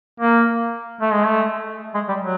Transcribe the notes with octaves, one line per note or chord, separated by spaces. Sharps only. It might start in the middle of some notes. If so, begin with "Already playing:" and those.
A#3
A3
G#3
A3
G#3
G3
F#3